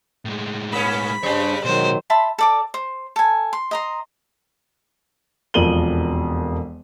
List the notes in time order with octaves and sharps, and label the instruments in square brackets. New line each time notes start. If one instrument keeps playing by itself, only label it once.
[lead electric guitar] A2 G#3
[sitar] A#3 B3 C#4 [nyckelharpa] B5
[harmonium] G2 D4 C5 [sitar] G3 [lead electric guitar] G#4 C#5
[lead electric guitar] B2 G#3 [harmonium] D#3 F#3 [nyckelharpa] C5
[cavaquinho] E5 A5 B5 C6
A4 D5 D6
C5
A4 G#5
C6
D#5 A#5 C6
[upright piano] E1 F2 A#4 D#7 F#7 G7